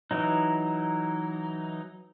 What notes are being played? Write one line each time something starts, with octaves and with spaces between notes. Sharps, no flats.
E3 F#3 D#4